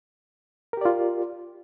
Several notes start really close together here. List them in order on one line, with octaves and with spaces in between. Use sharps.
A#4 G4 D5 F4